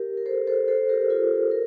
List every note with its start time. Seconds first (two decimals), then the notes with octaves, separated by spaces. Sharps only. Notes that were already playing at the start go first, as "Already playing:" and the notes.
Already playing: G4 A#4
0.17 A#4
0.26 A4 C5
0.47 A4 C5
0.68 A4 C5
0.89 G4 A#4
1.10 F4 A4
1.51 A#4